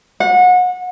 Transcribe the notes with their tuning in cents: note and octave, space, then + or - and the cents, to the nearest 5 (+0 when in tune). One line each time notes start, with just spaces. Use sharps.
F#5 -30